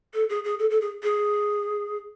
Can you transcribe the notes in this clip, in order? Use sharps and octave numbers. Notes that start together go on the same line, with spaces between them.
A4
G#4
G#4
A4
A4
G#4
G#4